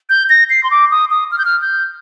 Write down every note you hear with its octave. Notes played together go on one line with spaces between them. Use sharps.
G6
A#6
C7
C6
D6
D#6
D#6
F6
G6
F6
G6